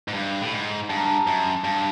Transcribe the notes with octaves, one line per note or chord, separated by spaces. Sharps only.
G#2
G2
A2
G#2
G2 A5
A#5
A5
F#2
G2 A5